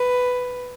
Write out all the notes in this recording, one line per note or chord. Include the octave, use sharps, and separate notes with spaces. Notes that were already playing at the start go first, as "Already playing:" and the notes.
Already playing: B4